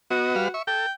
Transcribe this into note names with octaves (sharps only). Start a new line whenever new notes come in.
B3 F#4 D#5
G3 B4 F5
E5 C#6
A4 G5